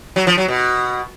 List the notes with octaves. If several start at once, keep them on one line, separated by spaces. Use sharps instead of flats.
F#3
F3
F#3
B2